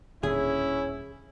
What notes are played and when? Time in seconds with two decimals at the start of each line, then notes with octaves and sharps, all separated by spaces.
0.23 D#1 A2 D3 C#4 E4 G#4